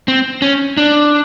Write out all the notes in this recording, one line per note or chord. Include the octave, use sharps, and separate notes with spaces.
C4
C#4
D4